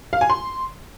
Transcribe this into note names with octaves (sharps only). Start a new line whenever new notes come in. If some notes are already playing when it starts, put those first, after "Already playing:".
F5
G#5
C6